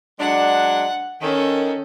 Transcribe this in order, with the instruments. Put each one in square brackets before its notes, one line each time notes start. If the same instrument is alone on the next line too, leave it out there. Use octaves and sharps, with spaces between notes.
[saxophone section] F#3 G#3 D4 [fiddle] F#5
[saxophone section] D#3 [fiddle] C#4 A4